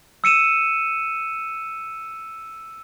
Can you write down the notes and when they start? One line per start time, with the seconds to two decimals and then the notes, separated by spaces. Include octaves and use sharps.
0.24 E6 C#7 D#7 E7